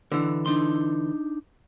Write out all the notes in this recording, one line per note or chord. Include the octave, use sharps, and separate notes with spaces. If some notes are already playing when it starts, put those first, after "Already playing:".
D3 E3
D4 D#4 C6